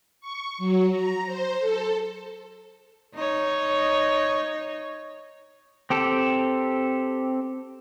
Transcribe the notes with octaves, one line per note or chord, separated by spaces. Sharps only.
C#6
F#3
A#5
C5
A4
D#4 C#5
C4 G4 A4